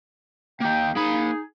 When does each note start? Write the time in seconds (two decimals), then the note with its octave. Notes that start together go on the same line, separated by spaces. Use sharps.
0.60 A#3 D#4 G5
0.95 A#3 D#4 G#4 B5